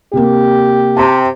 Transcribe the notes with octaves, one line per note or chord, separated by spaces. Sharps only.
C3 A#3 G4
C3 A5 A#5